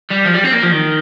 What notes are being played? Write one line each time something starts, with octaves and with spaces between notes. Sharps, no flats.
G3
F3
G3
C4
A#3
F3
D#3